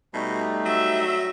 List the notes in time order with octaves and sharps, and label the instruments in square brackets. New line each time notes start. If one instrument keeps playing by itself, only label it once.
[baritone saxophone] B2 [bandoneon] G3 A3 D#4
[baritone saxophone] F#3 [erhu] E5